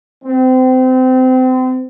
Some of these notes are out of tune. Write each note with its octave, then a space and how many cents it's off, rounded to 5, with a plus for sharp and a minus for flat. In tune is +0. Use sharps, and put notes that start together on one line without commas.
C4 -30